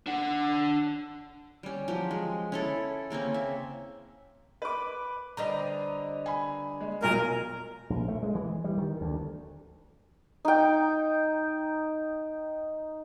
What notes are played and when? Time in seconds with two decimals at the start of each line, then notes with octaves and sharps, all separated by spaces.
0.06 D4 F#5
1.63 G3 C#4
1.88 F3 F#3 G4
2.11 G#3
2.52 C#4 E4 A4
3.10 C#3 A#3 C4 C#4
3.34 E5
4.62 B4 D6
5.37 D3 G3 B4 C5 D#5 A#5
6.26 G#5 B5
6.81 G#3
7.02 B1 E2 G#3 E4 F4 A#4 G#5
7.90 A#1
8.08 A3
8.23 G#3
8.35 E3
8.64 G3
8.78 D#3
9.01 D2
10.45 D#4 G5